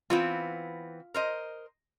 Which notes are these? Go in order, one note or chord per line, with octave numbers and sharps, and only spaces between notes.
E3 B3 C4 F4
A#4 C5 D#5